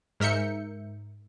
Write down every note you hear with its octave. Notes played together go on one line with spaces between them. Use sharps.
G#2 A#4 E5 G6 C#7